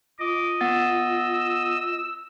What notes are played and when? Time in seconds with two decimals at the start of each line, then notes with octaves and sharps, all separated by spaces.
0.19 F4 D#5 D6
0.61 B3 F#5 E6 A6